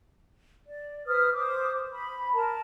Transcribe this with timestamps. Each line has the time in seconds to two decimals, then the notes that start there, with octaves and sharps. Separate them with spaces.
0.66 D5
1.07 B4 C5 D#6 F6
1.34 C5 D6 D#6
1.73 C5
1.92 B5
2.33 A#4 A5 A#5